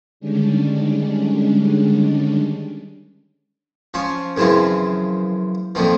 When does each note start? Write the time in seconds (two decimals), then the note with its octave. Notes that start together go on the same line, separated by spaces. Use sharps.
0.20 D3 D#3 G3 G#3 C#4 D4
3.94 F3 C#4
4.37 F#2 C#3 E3 F3 C4
5.75 F2 A#2 D#3 F3